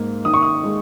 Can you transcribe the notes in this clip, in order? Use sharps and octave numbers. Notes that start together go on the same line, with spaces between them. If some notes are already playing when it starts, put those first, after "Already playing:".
Already playing: G#2 A#3
D#3 D#6
C#6
D#6
G#3